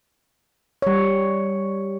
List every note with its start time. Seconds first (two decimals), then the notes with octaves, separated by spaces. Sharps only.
0.82 G3 C#5